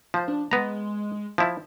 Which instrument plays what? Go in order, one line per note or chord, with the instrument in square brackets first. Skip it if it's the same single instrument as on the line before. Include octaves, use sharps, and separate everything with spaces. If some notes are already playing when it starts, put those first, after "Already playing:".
[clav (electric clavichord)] F3 [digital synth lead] C5
[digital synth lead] D4
[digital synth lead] G#3 [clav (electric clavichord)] B3 A#5
[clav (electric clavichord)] F3 E4